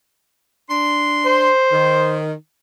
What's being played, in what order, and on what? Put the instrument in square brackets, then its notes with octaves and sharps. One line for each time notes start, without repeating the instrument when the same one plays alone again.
[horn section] D4 C6
[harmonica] C5
[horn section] D#3